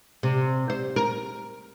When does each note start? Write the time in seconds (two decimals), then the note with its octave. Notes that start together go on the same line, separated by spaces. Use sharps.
0.23 C3
0.70 C5
0.96 A#4